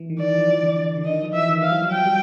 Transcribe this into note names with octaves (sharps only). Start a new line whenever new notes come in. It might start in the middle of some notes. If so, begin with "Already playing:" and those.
Already playing: E3
D#3
E3 D5
F3
E3
D3
D3
D#3 D#5
F3
E3 E5
D#3
E3 F5
F#3
F3
F#3 G5
G3